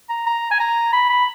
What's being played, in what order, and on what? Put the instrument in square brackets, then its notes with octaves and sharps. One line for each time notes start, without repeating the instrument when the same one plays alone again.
[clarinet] A#5
A#5
G#5
A#5
B5
B5